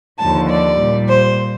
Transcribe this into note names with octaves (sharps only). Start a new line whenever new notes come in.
D#2 D3 F3 A5
D5
A#2 G3
C5